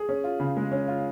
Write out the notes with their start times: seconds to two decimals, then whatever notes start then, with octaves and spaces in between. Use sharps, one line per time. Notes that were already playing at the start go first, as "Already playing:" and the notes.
Already playing: G#4
0.09 C#4
0.24 F4
0.40 C#3
0.57 G#3
0.72 C#4
0.88 F4